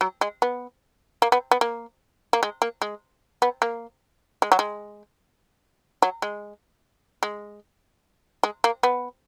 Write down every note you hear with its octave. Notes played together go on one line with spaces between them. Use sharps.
F#3
G#3
B3
A#3
B3
B3
A#3
A#3
G#3
A#3
G#3
B3
A#3
G#3
F#3
G#3
F#3
G#3
G#3
G#3
A#3
B3